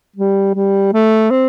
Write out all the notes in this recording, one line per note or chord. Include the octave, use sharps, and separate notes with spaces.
G3
G3
A3
C4